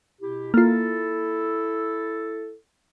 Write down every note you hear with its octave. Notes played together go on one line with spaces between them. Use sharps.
B2 E4 G4
A#3 E4 F4 A4